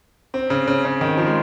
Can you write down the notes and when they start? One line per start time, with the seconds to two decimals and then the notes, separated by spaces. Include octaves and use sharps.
0.34 C4
0.50 C#3
0.67 C#3
0.85 C#3
1.01 D#3
1.18 F3
1.27 G#3